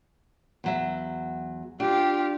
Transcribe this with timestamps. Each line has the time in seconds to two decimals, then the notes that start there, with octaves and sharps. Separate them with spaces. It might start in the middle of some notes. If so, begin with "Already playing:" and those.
0.64 E2 F#3 E5
1.80 D4 F4 G4